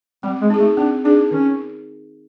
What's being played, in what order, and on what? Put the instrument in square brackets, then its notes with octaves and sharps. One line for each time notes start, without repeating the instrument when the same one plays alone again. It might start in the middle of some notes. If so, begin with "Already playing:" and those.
[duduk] G3 [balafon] C4
[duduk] G#3
[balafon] D#4 G#4
[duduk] A3
[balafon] C4 [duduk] D4
[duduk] D4 [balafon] D#4 G#4
[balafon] D#3 [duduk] C#4